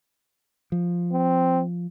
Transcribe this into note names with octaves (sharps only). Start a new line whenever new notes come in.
F3
C4